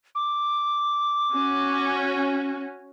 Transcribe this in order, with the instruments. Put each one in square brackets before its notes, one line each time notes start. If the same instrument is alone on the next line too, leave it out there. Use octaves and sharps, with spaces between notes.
[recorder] D6
[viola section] C#4 F#4